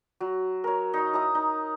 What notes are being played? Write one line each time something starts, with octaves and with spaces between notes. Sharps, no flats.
F#3
A#4 C#5
D#4 D#5
E4 A#5 D#6
D#4